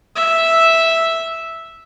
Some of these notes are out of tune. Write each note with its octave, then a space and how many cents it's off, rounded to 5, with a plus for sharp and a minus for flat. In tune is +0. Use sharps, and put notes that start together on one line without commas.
E5 -5